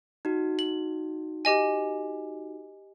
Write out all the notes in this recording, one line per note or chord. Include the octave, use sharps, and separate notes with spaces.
D#4 F#4
F#7
G4 D#5 G#5